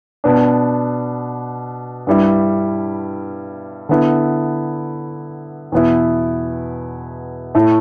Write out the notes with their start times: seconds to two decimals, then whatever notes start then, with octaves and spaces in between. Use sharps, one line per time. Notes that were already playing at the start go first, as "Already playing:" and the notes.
0.24 B2 B3 D4
2.07 G2 G3 E4
3.89 D3 B3 E4
5.72 E2 B2 B3 E4
7.55 A2 A3 E4